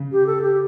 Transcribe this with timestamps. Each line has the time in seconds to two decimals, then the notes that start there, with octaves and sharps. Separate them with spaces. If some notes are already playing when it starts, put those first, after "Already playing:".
Already playing: C#3
0.12 G4
0.26 A4
0.42 G4